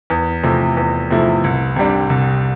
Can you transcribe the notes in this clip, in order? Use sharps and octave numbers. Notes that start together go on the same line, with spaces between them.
E2
C3 F3 A3 E4
E2
C3 F3 A3 E4
C2
C3 G3 D4
C2